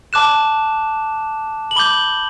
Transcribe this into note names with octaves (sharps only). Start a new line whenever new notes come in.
A5 D6 F#6 E7
F#7
B5 D6 G6 G7